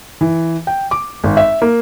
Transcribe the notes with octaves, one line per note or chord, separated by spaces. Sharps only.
E3
G5
D6
G#1
E5
A#3